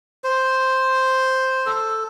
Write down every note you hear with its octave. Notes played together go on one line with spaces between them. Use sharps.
C5
A4